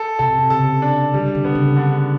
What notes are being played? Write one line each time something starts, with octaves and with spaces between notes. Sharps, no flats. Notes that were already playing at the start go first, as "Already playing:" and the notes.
Already playing: A4
C3 A4
C3
C#3 A4
D4
D3 G3
D3
B3
C#3
D3